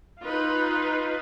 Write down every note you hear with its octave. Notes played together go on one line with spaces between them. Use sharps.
D#4 F4 B4